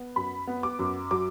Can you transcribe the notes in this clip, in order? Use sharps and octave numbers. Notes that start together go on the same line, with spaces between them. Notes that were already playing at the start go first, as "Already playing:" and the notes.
Already playing: B3
F#2 B5
B3
D6
F#2
F#3 D6